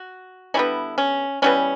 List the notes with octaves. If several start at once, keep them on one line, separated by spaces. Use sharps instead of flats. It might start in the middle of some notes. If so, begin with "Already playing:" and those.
Already playing: F#4
D3 G3 B3 C#4 E4
C#4
E3 G3 B3 C#4